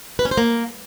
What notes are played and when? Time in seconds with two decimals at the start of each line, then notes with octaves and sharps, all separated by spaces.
0.19 B4
0.25 C#4
0.31 C5
0.38 A#3